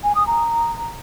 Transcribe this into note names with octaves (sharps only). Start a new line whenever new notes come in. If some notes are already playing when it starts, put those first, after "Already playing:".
G#5
D#6
A#5